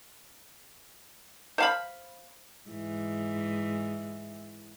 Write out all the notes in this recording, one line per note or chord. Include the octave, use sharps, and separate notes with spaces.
C5 F5 B5
G#2 E3